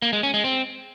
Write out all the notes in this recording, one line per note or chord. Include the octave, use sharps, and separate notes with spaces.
A#3
G#3
C#4
G#3
C4